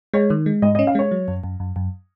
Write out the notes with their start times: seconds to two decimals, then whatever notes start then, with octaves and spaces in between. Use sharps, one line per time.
0.14 G#3 C#5
0.30 D#3
0.46 G#3
0.62 G#2 D#5
0.75 D#5
0.79 C#4
0.87 F5
0.95 G#3 C#5
1.11 F#3
1.28 F#2
1.44 F#2
1.60 F#2
1.76 F#2